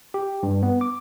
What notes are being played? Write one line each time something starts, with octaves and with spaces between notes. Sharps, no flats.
G4
G2
B3
D6